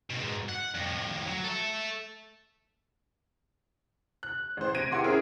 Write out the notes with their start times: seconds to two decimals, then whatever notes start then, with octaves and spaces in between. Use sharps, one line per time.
0.10 G#2 B2
0.49 F#5
0.74 F2 A2
1.27 F#3
1.44 A4 E5
4.23 F#6
4.57 A1 C5
4.74 C3 G#6 A#6 D7 D#7
4.91 E4 G4 F#5 C6 D6
5.04 C4 C#4 E4 G#4 A#4